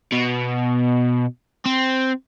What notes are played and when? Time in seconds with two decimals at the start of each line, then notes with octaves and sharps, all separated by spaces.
0.12 B2
1.65 C4